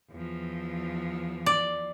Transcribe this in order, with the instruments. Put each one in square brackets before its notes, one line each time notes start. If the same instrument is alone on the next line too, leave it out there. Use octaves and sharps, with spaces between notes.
[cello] E2 F3
[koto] D5